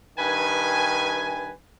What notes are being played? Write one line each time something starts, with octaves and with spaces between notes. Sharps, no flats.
G2 D#3 B4 G#5